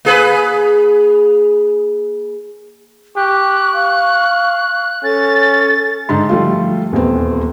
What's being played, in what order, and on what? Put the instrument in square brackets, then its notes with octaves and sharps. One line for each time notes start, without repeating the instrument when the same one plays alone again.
[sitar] A#3 G#4 B4
[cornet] G4 [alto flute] C#6 [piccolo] F#6
[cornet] F5
[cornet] C#4 [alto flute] A4 [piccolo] A6
[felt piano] G#2 D3 C6
F3 G3 A3 F4
D#1 E2 B3 C4